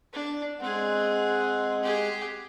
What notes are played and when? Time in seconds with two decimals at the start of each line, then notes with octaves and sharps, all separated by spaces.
0.13 D4
0.60 G#3 C4 G#4 F#5
1.82 G4 G#4